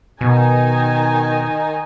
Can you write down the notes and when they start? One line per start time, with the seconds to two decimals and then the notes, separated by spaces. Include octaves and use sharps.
0.21 B2 D#3 D#4 G#5